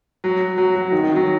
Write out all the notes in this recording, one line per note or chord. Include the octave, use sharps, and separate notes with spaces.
F#3
F#3
F#3
D#3
D#3
F#3